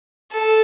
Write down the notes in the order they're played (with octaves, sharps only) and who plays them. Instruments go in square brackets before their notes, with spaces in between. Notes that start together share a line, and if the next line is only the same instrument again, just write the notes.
[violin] A4